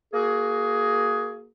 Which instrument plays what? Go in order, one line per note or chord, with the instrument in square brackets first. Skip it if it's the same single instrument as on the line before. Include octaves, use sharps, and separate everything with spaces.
[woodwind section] A#3 F#4 G#4